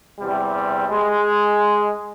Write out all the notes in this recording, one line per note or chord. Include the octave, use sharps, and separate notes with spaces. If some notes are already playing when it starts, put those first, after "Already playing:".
E2 C3 G3
G#3